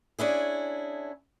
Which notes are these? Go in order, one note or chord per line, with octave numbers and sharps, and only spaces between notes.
C#4 D4 E4 G#4